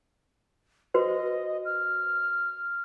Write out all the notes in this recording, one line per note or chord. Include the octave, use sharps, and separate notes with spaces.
F#4 B4 C5 D#5
F6